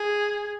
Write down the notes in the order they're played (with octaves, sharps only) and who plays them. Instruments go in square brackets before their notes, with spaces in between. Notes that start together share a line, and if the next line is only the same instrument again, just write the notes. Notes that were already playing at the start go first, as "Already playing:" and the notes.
Already playing: [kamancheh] G#4